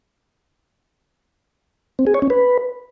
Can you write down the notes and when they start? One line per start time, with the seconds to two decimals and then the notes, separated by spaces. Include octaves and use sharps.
1.99 C4
2.07 G#4
2.14 C#5
2.22 C#4
2.30 B4